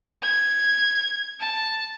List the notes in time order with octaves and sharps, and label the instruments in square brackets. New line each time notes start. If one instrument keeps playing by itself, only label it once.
[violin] G#6
A5